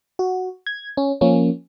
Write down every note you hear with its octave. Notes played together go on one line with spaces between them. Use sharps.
F#4
G#6
C#4
F3 A#3 C#4